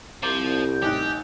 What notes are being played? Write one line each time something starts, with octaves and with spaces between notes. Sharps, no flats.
C2 F3 A#5 D6 G6
A1 D#4 G4 F#6